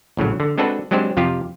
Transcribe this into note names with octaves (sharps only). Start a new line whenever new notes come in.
A#1 A2 C#3 F#3
D3
G#3 C4 D4 F#4 A4 B4
F#3 G#3 C4 D4 G4 C5
F2 C3 F3 F4 G4